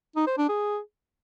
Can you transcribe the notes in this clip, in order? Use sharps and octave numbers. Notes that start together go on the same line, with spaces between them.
D#4
C5
D4
G#4